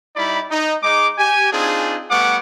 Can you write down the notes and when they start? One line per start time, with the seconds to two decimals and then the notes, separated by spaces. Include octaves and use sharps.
0.16 G3 D#4 E4 D5 B5
0.51 D#4
0.83 G#3 D#4 D6
1.18 G4 G#5
1.52 C4 D4 D#4 F4 G#4
2.10 G3 A3 B3 F#5 C#6 D6